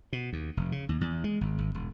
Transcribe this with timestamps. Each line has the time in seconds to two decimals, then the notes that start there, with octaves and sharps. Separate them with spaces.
0.13 B2
0.33 D#2
0.57 F1
0.72 C#3
0.89 D#2
1.01 E2
1.24 G#3
1.41 G#1
1.58 G#1
1.75 E1